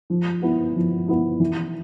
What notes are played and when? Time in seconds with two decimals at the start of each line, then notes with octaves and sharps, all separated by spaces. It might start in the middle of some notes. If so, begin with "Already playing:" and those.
0.10 F3
0.42 B3 E4
0.76 F3
1.08 B3 E4
1.40 E3